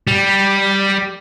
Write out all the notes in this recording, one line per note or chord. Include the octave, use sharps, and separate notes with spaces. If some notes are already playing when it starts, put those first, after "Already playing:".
G3